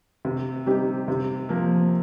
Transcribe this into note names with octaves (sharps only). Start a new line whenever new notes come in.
C3
G3 C4 D#4 G4
C3
F3 A#3